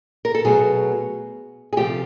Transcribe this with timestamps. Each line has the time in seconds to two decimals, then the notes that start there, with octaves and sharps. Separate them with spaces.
0.25 A#4
0.35 A4
0.45 B2 F#3 A3 G#4
1.73 G#4
1.77 C3 F3 A3 G4